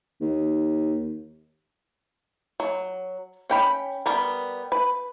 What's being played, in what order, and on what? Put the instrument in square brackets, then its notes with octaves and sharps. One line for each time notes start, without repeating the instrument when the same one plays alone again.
[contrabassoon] D#2
[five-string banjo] F#3
C#4 G5 B5
G3 B3 A#4
B4